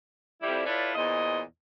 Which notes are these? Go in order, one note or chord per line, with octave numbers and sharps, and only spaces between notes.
F2 G3 E4
E4 F4 A4 B4 C#5 D5
E2 A#2 C5 D#5